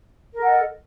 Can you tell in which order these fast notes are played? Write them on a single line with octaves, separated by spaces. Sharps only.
A#4 A4 F#5 D#5